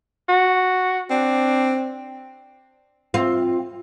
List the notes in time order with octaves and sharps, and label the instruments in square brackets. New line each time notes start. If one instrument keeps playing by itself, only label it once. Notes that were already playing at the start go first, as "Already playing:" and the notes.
[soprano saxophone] F#4
[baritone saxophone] C4 [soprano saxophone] D4
[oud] C4 F4